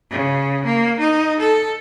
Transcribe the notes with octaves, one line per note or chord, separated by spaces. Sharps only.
C#3
A#3
D#4
A4